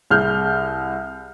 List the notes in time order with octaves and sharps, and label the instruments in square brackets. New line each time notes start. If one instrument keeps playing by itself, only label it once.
[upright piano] C2 G#4 F6 G6